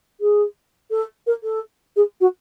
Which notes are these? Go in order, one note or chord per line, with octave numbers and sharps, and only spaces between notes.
G#4
A4
A#4
A4
G#4
F#4